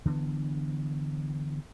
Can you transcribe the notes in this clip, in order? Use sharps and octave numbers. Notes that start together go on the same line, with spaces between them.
D3 E3 A3 B3